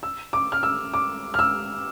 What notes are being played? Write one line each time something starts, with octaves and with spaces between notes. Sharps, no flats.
E6
D6
F6
E6
D6
F6
E6